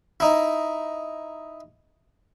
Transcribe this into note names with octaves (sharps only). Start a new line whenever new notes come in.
D#4 E4